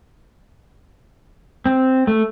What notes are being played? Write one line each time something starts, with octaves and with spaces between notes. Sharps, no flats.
C4
A3